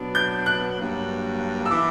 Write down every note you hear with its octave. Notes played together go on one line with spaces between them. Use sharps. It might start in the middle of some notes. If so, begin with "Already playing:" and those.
Already playing: B2 F#3 B3 D4
G6
F#6
G2 F#3 A#3
E6
E3 B3 E4 D6